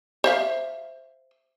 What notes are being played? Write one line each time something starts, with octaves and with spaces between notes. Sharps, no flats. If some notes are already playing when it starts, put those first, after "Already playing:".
C5 E5 F5